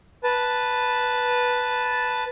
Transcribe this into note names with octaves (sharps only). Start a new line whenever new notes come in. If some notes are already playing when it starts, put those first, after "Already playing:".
B4 A5